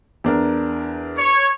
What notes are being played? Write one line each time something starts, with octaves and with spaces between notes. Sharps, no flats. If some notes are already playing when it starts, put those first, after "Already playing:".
E2 D4 A#4
C#5